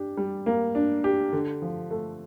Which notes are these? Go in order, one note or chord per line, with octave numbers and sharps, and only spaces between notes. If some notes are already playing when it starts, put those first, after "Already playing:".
Already playing: D4 G4
G3
A#3
D4
G4
D3
F3
A3